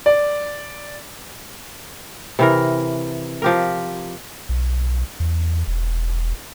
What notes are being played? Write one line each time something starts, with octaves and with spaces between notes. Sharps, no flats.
D5
C3 E3 A#4
F3 G4 A#4
B1
E2
E1